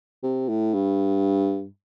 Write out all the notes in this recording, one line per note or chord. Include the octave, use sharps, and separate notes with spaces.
C3
A2
G2